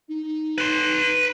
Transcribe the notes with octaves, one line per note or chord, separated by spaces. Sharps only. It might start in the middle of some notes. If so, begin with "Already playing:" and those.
D#4
B4 C6